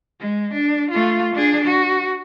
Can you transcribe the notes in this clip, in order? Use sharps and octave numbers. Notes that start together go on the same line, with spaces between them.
G#3
D4
A3 F4
D4 G#4
F#4